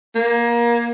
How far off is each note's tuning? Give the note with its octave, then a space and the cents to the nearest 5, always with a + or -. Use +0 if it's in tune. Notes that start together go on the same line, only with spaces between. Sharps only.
A#3 +20